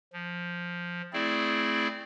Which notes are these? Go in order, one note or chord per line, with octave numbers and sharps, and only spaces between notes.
F3
A3 C4 E4 G#4 D5